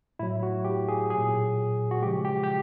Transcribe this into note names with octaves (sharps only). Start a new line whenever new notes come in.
A2 F#3 E4
F#4
G4
G#4
A#2 F#3 G#4
F#4
C#3 F3 G#3 G4
G4
G4